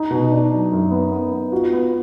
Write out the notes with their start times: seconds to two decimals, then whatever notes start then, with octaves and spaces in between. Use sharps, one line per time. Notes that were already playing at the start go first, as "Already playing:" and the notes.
Already playing: D#4
0.10 B2
0.32 D4
0.52 F#3
0.72 F#2
0.91 B3
1.12 B3
1.32 B3
1.52 F4 F#4
1.73 B3